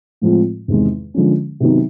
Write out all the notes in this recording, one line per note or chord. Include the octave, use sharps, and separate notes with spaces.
A2 F3 G#3 C4 F4
E2 C3 D#3 G#3
D3 F3 G#3 C#4
C3 D#3 F#3 B3 D#4